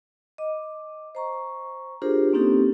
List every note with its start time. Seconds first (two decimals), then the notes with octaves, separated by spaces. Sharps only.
0.38 D#5 D6
1.15 C5 A#5 C#6
2.02 D4 F4 G4 G#4 A#4 C5
2.33 A#3 C4 C#4 D#4 G4 A4